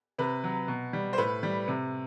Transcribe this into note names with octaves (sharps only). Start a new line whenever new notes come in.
C3 B4
F#3
B2
G3
C5
A2 B4
G3
C3